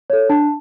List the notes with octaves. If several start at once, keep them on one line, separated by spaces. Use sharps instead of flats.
A4 C#5
D4 A5